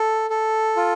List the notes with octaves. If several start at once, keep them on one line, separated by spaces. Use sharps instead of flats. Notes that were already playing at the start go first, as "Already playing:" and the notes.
Already playing: A4
A4
F4